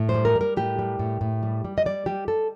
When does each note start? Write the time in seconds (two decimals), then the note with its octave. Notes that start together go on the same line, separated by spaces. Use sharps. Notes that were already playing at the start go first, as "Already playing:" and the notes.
Already playing: A2
0.09 C5
0.15 G3
0.25 A#4
0.35 G3
0.41 A#4
0.57 A2 G4
0.79 G3
0.99 A2
1.21 A2
1.43 G3
1.65 G3
1.78 D#5
1.86 G3 D5
2.06 G3 G4
2.28 G3 A4